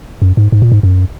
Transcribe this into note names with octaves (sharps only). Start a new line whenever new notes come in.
F#2
G#2
G#2
A#2
G#2
F#2